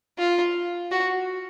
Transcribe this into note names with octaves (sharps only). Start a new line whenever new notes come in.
F4
F#4